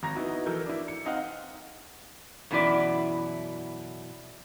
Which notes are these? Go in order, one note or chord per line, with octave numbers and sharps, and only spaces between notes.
G#1 A#5 A#6
B3 D#4 E4 F#4
E3 F#3 A4 A#4 G6
D4 E4
C#7
C4 D#4 D#5 F5 F#5
F#2 B2 E3 E4 D5